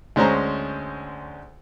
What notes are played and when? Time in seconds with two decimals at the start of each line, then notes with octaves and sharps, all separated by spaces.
0.16 D2 G#3 C#4 C5 A#5